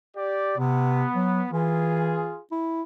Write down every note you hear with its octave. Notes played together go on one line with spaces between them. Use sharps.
G4 D5
C3 B3
F#3
E3 F4 G#4
E4